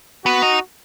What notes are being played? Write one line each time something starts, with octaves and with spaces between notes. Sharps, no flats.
B3 F#4
D#4